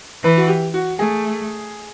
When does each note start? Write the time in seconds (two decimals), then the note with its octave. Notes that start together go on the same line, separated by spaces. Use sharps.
0.23 E3 B4
0.38 F#4
0.48 G4
0.74 F#4
0.98 A3 G#4